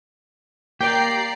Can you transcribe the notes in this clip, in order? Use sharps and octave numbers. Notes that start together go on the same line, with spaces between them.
A#3 G4 D5 G5 A#5 C7